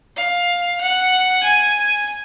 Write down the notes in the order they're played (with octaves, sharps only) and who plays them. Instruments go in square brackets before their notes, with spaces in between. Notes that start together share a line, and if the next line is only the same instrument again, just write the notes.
[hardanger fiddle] F5
F#5
G#5